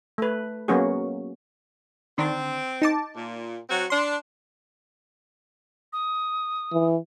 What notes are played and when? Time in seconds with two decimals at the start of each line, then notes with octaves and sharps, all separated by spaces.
0.18 A3 B4
0.68 F#3 A#3 B3 C#4 F#4 G#4
2.18 D3 D#3 C4 D4
2.82 D#4 A5 D6
3.15 A#2
3.69 F#3 C4 F#4
3.90 D4 C6
5.93 D#6
6.72 E3